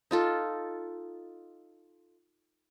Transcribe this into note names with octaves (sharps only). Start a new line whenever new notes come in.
D#4 F4 A4